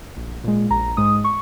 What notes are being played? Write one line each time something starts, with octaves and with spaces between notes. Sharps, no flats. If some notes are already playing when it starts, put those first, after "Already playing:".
A#1
A#2 G#3
A#1 A#5
G#2 G#3 D#6
C#6